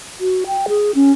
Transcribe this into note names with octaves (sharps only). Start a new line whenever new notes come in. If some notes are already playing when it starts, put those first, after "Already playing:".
F#4
G5
G#4
C#4